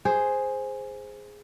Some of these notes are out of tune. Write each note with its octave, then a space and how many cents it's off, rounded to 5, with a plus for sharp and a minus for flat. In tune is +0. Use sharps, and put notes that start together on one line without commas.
G#4 +0 C5 +0